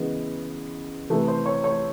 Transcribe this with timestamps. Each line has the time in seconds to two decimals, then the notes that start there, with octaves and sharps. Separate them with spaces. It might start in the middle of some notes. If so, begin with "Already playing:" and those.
Already playing: C#3 E3 G#3 B3
1.10 C3 E3 A3 B4
1.28 C5
1.46 C#5
1.64 C#5